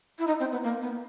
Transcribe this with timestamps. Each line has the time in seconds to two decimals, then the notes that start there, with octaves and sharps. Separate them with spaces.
0.19 E4
0.27 D#4
0.40 C4
0.51 B3
0.63 A#3
0.82 B3